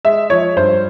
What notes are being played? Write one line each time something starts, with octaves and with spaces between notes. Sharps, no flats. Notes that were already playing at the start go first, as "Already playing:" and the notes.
G#3 E5
F3 C#5
G2 C5